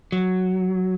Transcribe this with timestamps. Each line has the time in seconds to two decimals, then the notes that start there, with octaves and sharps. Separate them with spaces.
0.12 F#3